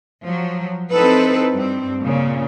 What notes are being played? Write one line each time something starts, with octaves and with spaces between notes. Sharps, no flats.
F3 F#3
C4 D#4 E4 A4 B4
G2 C4
A#2 C#3